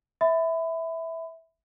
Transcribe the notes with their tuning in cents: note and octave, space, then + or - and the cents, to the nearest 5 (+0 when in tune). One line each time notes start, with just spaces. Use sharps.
E5 -10 B5 +25